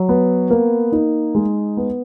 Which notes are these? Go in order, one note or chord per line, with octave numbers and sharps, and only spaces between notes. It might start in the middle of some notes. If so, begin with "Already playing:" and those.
Already playing: F#3
B3
A#3
D#4
G#3
B3